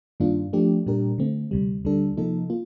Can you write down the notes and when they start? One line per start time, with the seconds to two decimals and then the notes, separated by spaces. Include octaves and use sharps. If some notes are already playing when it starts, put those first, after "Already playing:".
0.20 G2 D#3 A#3 D4 F4
0.53 F3 A3 D4 G4
0.86 A#2 G3 D4 G4 A#4
1.18 D3 A3 C4
1.51 D2 C3 G3
1.84 D2 D3 G3 D4 A4
2.17 C3 F3 A#3 D#4 A4
2.50 A#3 F4